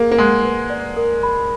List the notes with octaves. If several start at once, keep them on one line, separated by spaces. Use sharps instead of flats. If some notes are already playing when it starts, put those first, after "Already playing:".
Already playing: A#3 G#4
A#3
G#3 F#5
B4
D5
A#4
B5